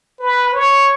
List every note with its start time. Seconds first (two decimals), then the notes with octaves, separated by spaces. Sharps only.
0.20 B4
0.53 C#5